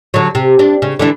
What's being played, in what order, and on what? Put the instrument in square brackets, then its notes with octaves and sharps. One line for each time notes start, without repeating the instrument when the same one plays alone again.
[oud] D3 F#3
C3
D4
C#3
D3 E3 D4